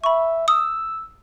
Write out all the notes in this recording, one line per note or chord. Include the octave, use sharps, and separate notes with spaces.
E5 B5 C#6
D#6 E6